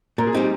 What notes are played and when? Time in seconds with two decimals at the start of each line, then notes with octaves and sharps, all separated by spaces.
0.18 A#2 A#4
0.27 G#4
0.34 G3 C4 D#4 G4